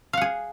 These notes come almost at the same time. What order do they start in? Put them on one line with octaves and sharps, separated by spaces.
F5 F#5 G#4